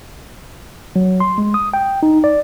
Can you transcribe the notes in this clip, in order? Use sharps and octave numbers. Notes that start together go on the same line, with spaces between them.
F#3
C6
G#3
D#6
G5
D#4
D5